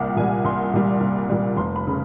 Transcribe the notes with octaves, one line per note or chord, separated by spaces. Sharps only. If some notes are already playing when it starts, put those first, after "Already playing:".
Already playing: C2 A#2 G3 F#5 G5
A#2 G3 G#5
C2 C6
A#2 G3
C2
A#2 G3
F1 C6
B5
C#3